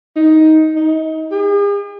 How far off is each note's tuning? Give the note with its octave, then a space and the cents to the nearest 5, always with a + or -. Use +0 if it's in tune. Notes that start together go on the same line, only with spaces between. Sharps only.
D#4 +15
D#4 +30
G#4 -45